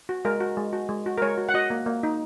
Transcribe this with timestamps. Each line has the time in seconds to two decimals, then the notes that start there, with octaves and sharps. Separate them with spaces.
0.09 F#4
0.25 G#3 A#4
0.40 F#4
0.57 G#3
0.73 F#4
0.89 G#3
1.06 F#4
1.18 A#4
1.22 G#3 C#5
1.38 F#4
1.49 F#5
1.54 F#4 D#5
1.70 A#3
1.86 A#3
2.03 D#4